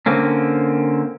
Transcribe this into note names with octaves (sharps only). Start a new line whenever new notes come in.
D3 A#3 C4 C#4